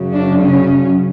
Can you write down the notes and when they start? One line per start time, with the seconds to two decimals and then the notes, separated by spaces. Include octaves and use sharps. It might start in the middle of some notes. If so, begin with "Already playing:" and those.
Already playing: F#2 C#3 F#3
0.13 D4
0.42 C#4